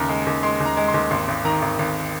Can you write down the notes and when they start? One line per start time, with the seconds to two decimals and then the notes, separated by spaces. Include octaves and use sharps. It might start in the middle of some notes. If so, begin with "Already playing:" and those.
Already playing: D#2 C#3 A#5
0.09 G#3
0.27 D#2
0.43 G#3 C6
0.60 D#2
0.65 A#5
0.77 G#3
0.88 C6
0.94 D#2
1.11 G#1 C6
1.28 G#1
1.45 D#3 A#5
1.62 G#1
1.79 G#1